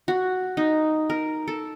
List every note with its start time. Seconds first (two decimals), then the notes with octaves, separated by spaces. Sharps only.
0.08 F#4
0.57 D#4
1.10 A#4
1.48 A4